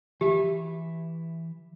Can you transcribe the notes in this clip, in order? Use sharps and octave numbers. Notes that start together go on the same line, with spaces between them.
E3 G4 E5